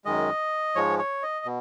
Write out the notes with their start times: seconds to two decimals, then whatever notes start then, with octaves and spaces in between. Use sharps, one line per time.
0.05 F#2 D#3 G#3 D#5
0.75 G#2 F3 G#3 C#5
0.99 C#5
1.23 D#5
1.45 B2